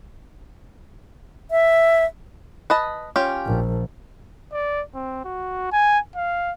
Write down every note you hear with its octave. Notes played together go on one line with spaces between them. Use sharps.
E5
B4 D#5 A5
C#4 F4 G4
A#1 F3
D5
C4
F#4
G#5
F5